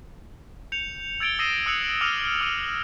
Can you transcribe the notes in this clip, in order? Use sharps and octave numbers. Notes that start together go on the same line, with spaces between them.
G6 C#7 F7
E6 G#6 A6 D7 F7 G7
D#6 E6 A#6 C7 D#7 E7
D#6 E6 F#6 C#7 F7 F#7
D6 E6 F6 C#7 D#7 F7
D6 F6 D7 D#7 F#7